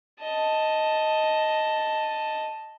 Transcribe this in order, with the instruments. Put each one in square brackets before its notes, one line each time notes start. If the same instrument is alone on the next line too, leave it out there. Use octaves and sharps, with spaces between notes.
[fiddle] D#5 A5